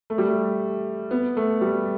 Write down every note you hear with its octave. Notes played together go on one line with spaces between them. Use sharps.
A3
G3
A3
B3
A3
G3